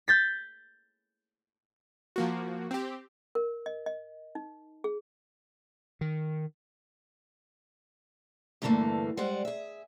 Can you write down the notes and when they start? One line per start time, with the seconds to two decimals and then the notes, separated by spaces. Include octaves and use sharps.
0.08 G6 A6 B6
2.16 F3 A#3 F#4
2.71 C4 G4
3.35 A#4
3.66 D#5
3.86 D#5
4.35 D#4
4.84 G#4
6.01 D#3
8.62 E2 G2 D3 E3 A3 A#3
9.17 G3 G#3 C5 F#5
9.45 G#4 E5